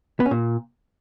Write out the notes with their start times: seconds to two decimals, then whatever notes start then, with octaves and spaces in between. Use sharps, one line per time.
0.20 B3
0.26 C#4
0.31 A#2